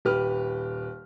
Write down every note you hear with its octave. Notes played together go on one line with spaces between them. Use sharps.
D#1 G4 B4 F6